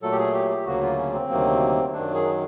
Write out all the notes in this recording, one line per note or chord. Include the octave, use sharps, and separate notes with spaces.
A#2 F#3 A3 A4
G4
G#4
G4
G4
D2 C#3 F#3 A#3 F#4
F4
C#4
C4
D2 C3 D#3 F#3 A#3
F#2 D#3 F#3 D4
G#4